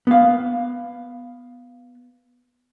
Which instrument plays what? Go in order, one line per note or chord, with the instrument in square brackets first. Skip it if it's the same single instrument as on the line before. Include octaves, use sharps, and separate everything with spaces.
[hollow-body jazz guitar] B3 F5